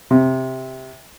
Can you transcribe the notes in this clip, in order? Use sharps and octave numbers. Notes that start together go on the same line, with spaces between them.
C3